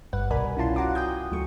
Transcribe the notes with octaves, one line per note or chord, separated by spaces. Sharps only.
G1 G2 G3 B4 F#5
C2 B2 A#4 D5 G#5 B5
C#4 E4 F4 A5 C6
F4 F#4 F#5 A#5 C6 D6
G5 G#5 D#6 G6
D2 F#3 A3 C#6